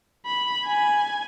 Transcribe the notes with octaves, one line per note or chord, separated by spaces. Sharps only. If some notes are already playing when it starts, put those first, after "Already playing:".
B5
G#5